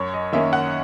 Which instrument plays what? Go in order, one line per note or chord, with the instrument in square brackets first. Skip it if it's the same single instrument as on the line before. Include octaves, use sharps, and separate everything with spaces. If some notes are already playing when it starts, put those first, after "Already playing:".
Already playing: [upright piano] F#2 C#5
D#5
D#3 A#3 C#4 E5
F#5